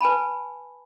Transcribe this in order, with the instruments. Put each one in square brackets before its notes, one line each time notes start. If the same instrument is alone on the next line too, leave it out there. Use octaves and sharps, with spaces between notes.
[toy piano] B4 G#5 A5 B5